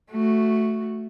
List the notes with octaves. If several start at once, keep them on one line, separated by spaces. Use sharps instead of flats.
A3 F#4